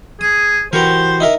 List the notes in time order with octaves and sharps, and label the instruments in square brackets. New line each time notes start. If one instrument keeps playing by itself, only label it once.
[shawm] G#4 [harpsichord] D#6
[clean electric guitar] E3 F#4 G4 [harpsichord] A#4 A#5 [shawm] C5
[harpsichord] D#4 E4 A#4